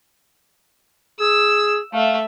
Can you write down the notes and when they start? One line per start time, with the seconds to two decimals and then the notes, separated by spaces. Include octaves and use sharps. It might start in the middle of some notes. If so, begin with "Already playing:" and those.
1.20 G#4 E6
1.93 A3 E5 F5